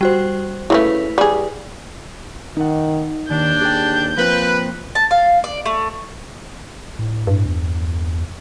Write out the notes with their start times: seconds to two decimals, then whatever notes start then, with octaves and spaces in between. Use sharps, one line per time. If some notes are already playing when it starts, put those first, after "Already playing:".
0.01 G3 F#4 C5
0.70 C#3 G3 A3 E4 B4
1.18 G3 G#4
2.57 D#3 D#4 F#5
3.31 D#2 D#3 D4 G6
3.61 G4 G#4 G5
4.18 F3 A#3 C4 B4
4.95 A5
5.11 F5
5.44 D5
5.66 A3
6.99 A2
7.27 G2
7.46 E2